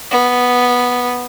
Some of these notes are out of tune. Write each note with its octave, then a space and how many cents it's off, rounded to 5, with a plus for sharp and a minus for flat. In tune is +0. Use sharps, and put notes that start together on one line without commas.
B3 -5